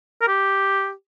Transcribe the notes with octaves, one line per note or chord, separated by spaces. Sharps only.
A#4
G4